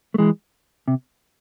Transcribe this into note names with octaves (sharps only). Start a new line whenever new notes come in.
A3
E3 G#3
C3